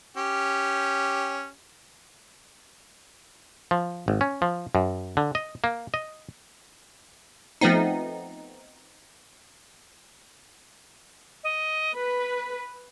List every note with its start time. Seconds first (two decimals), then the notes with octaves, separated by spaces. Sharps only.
0.17 C#4 G4
3.71 F3
4.08 G#1
4.21 C#4
4.42 F3
4.75 F#2
5.17 D3
5.35 D#5
5.64 A#3
5.94 D#5
7.61 F3 A3 B3 C4 D#4
11.44 D#5
11.96 B4 B6